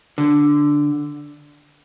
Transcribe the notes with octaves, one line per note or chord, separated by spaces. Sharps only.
D3